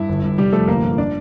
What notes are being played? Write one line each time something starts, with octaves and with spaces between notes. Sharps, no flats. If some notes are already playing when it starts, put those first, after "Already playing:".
Already playing: G2 E4
G1
G2
F1 G3 G4
F2 A3 A4
G1 A#3 A#4
G2
D4 D5